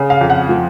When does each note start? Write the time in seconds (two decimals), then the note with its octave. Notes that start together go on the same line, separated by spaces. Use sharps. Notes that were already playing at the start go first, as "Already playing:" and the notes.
Already playing: C#3
0.10 F5
0.21 F2
0.30 F#5
0.49 F3